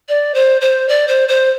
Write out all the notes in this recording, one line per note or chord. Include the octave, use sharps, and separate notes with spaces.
D5
C5
C5
D5
C5
C5